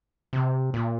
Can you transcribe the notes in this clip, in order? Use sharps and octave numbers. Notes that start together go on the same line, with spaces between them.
C3
A#2